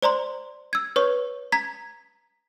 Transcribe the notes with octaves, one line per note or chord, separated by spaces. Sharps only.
C5 D5 A#5 C6
E6 G#6
B4 C#5 C#6
A#5 G#6 B6